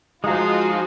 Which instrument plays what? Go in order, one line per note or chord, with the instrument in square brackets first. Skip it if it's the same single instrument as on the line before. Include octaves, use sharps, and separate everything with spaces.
[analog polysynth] F3 D#4 [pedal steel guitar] G#3 G#4 [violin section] F4 [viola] F#4